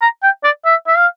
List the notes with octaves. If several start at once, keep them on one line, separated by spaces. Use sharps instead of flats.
A#5
G5
D5
E5
E5
F5